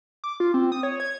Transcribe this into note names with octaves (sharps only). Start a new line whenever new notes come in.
D6
F4
C4
D#6
C#5
G#6